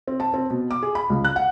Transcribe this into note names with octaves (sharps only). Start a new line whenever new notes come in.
C4
A5
C4
B2
D6
G#4
B5
C#2
F#6
F#5